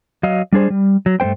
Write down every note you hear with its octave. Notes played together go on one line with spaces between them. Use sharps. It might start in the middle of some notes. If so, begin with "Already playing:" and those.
F#3 D#5 F5
G3 D4 G#4 C5
G3
F#3
G2 A3 A#3 C5 G5